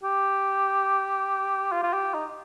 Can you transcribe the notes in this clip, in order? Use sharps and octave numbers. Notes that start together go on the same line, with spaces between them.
G4
F4
F4
G4
D#4